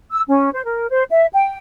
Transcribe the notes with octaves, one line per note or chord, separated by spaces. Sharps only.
E6
C#4
C5
A#4
C5
E5
G5